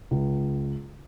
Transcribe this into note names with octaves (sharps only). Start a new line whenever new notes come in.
C#2